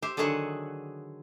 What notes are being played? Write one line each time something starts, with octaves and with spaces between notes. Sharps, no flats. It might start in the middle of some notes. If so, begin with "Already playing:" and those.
G4 C5 E5
D3 D#3 F#3 G#4 E5 F#5